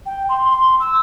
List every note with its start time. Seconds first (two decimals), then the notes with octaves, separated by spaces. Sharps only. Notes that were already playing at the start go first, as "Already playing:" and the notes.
0.06 G5
0.29 C6
0.50 C6
0.80 E6